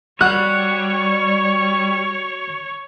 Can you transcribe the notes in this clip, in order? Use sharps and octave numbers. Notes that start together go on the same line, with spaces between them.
G3 F#4 C#5 C#6 F#6